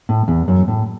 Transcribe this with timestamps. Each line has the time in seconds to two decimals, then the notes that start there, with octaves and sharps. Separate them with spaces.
0.09 A2
0.28 E2
0.48 F#2
0.68 A2